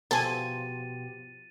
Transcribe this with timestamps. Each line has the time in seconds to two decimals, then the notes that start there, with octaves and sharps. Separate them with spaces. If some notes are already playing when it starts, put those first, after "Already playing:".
0.11 B2 F3 B3 G4 A4 G#5 A6 D#7